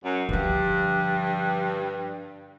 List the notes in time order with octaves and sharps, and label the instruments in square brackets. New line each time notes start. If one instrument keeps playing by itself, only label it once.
[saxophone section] F#2
[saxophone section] G2 [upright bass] D3 F3